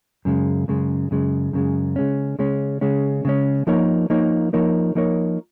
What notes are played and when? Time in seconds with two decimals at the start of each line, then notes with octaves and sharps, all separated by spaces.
0.25 F#2 C#3 G#3
0.68 F#2 C#3 G#3
1.11 F#2 C#3 G#3
1.53 F#2 C#3 G#3
1.96 C#3 G#3 C#4
2.39 C#3 G#3 C#4
2.81 C#3 G#3 C#4
3.25 C#3 G#3 C#4
3.67 F3 A#3 D#4 A#4 C#5
4.10 F3 A#3 D#4 A#4 C#5
4.53 F3 A#3 D#4 A#4 C#5
4.95 F3 A#3 D#4 A#4 C#5